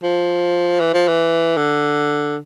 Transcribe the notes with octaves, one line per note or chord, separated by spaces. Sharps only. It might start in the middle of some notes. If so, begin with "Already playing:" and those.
F3
E3
F3
E3
D3